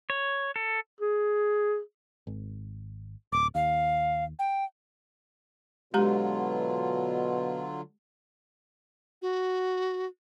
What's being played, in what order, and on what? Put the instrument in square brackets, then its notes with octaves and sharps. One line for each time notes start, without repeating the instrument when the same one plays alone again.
[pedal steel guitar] C#5
A4
[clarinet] G#4
[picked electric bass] G#1
[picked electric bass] D1 [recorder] D6
[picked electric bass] D#2 [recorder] F5
[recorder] G5
[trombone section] B2 [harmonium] D3 F#3 F4 [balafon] G#3 G4 A#5
[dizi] F#4